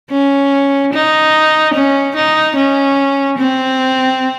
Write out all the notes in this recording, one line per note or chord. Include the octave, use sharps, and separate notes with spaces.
C#4
D#4
C#4
D#4
C#4
C4